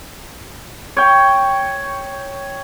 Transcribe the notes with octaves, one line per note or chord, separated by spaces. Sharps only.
C#5 G5